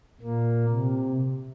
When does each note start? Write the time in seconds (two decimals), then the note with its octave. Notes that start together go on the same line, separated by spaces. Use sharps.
0.21 A#2 A#3
0.69 C3